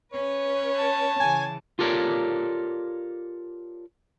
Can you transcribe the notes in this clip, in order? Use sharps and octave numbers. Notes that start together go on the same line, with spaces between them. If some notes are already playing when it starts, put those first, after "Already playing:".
C#4 B4 C#5
A5
C#3 E3 G#5
F4 G4 A4 A#4 C#5 D5